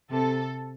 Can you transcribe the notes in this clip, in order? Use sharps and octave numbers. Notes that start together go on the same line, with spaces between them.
C3 A4